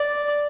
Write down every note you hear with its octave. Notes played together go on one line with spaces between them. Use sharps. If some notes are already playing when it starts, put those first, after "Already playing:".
Already playing: D5